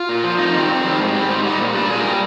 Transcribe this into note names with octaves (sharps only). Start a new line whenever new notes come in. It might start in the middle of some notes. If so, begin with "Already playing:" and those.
Already playing: F4
A#2
F3
F2 D#4
D#3 G3 C4
F2
D#3 G3
G#2
G3
G#2 C4
G3 D#4
A#2
G3 D4
A#2 G#4
G3 A#4